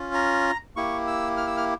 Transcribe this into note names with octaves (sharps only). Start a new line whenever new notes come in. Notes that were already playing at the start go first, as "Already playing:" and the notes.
Already playing: C#4 F4
A#5
A#3 E4 G4 C#6
E6
F6
E6
F6